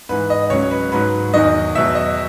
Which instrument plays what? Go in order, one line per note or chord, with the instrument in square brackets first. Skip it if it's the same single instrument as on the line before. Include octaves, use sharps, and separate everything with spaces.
[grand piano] G#2 E3 B4
D#5
C#2 C#3 F#3 C#5
B4
G#2 F#3 B4
E2 D#3 F#3 D#5
E2 B2 F#3 E5
D#5